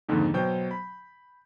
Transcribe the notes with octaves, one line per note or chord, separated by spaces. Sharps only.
F2 G#2 D3 D#3 A#3
B2 F#3 C5 G5 G6
B5